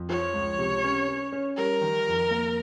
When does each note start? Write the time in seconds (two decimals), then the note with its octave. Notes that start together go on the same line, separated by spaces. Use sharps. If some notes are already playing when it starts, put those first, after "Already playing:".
Already playing: F2
0.09 F3 C#5
0.34 C#2
0.59 C3
0.84 C#4
1.09 C#4
1.32 C#4
1.57 G3 A#4
1.81 D#3
2.07 F2
2.31 A#3